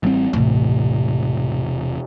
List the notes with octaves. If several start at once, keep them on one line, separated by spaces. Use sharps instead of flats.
A1 G3 C4
E1 A1 C3